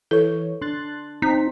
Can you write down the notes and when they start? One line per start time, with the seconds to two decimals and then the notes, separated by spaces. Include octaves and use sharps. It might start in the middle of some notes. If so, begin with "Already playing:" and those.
0.11 E3 A4 C#5
0.61 D4 C6 F#6 A6
1.22 C4 D#4 B6